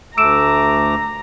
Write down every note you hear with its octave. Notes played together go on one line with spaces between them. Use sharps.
D2 A3 A#5 D6 E6 D7 E7